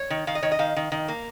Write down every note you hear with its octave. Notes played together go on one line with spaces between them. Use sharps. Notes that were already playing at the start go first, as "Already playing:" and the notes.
Already playing: C#5
D#3
D#3 F5
D#5
D#3 C#5
D#5
D#3 F5
D#3
D#3
A#3